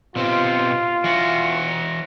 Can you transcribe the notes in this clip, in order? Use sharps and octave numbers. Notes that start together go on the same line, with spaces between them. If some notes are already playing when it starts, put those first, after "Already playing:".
B2 C4 F4 G4
E3 F#4